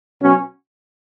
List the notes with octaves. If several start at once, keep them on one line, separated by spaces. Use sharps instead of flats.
B2 F#3 C#4